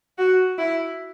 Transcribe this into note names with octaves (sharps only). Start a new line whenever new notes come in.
F#4
E4